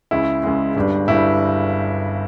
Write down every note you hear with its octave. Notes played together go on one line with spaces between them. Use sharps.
C#2 C#3 G#3 E4
C#2 C#3 G#3
G1 G2 G3
G1 G2 G3 E4